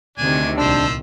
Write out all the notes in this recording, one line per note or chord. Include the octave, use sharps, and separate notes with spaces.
D2 C3 D#3 D4 G#5
C2 A#2 F3 D4 C5 E6